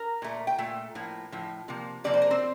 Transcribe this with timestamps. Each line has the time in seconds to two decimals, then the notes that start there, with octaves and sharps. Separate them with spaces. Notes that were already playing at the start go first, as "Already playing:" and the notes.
Already playing: A#4 A#5
0.22 A#2 A3
0.47 G5
0.58 A#2 A3
0.95 A2 F3 A#3
1.32 A2 F3
1.68 C3 F3 A#3
2.04 C3 F3 A#3 D5
2.14 C5
2.22 A#4
2.30 C4 C5